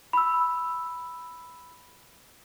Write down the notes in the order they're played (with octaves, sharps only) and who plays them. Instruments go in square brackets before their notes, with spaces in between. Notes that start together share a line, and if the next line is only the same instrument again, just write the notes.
[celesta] B5 E6